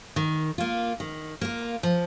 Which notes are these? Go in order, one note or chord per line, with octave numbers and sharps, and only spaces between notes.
D#3
A#3 F4
D#3
A#3 F4
F3